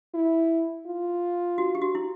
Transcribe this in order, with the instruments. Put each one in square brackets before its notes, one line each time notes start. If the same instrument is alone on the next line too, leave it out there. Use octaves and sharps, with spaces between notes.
[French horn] E4
F4
[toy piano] F#4
G4
F#4
E4